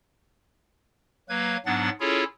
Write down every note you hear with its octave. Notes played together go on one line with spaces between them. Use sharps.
F#3 A#3 B4 G#6
G#2 F#3 B3 D4 F#5 A6
C#4 E4 F4 G#4 A4 C#5